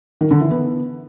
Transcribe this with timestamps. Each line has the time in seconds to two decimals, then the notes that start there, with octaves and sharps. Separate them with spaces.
0.21 D#3
0.31 D3
0.41 E3
0.51 B3